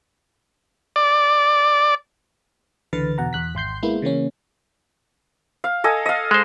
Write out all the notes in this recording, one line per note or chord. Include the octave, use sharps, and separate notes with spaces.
D5
C#2 D3 E3 B4 F6 A6
E2 B2 F#5 A#5
E2 F#6 B6
G#1 C6 G6 C7
G#3 A#3 B3 E4
C#3 E3 A#3 C#4
F5
A4 D#5 G#5
D#5 F5
G#3 C5